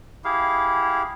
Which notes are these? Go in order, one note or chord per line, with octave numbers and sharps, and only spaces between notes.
E4 G4 G#4 F5